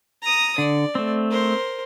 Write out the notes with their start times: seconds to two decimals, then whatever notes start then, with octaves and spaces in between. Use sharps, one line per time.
0.22 A#5 D#6
0.58 D3 D5
0.95 A3 C4
1.30 A#4 C5